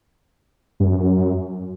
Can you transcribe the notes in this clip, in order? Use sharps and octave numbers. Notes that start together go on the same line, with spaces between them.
G2
F#2